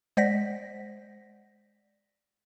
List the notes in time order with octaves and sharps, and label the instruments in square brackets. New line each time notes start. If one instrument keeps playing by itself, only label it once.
[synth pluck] G#3 C5 D5 F#5 A#6 B6